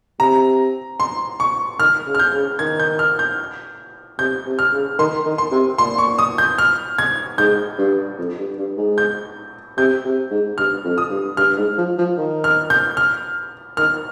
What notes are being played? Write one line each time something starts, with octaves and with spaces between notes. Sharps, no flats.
C3 A#5
C6
C#6
D#3 F6
C#3
F6
G6
C#3
D#3 G#6
G6
F6
G6
C3 G6
C3
F6
C#3
D#3 C6
D#3
C6
C3
A#2 C6
C#6
D#6
G6
F6
G#6
G#2 G6
G2
F2
G2
G2
G#2
G6
C3 G6
C3
G#2
G2 F6
F2
D#6
G2
G2 F6
G#2
F3
F3
D#3
F6
G6
F6
D#3 F6